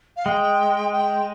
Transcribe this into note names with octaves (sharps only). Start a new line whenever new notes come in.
F5
G#3 G5
G5